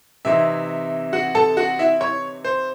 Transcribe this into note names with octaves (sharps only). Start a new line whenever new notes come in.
C3 E3 C4 D#4 E4 E5
F#4 F#5
A4 A5
F#4 F#5
E4 E5
C#5
C5